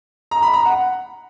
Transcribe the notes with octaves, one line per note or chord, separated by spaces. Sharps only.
A#5
B5
A#5
F#5